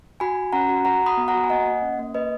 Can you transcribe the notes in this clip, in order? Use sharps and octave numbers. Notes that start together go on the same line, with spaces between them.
F#4 G#5 B5
F#4
C#4 F#5 A#5
F#4
F#4 F#5 A#5
F#4 B5 D#6
B3
F#5 A#5
F#4
G#5
A#3 D#5 F#5
A#3
C#4
A#3
A#3 B4 D#5